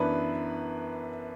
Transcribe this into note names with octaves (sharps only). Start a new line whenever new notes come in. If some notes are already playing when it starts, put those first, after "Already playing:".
Already playing: F#2 E3 B3 D4 B4